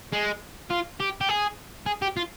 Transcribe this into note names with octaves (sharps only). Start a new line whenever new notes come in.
G#3
F4
G4
G4
G#4
G#4
G4
F4